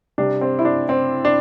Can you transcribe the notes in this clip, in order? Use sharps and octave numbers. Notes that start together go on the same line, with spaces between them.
C3 G3 D4
C4
E4
D4
C4
D4